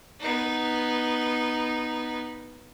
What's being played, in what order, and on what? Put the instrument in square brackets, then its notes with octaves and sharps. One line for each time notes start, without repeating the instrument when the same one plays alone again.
[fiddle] B3 D#4